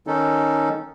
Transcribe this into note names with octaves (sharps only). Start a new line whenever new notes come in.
D#3 C#4 D#4 A4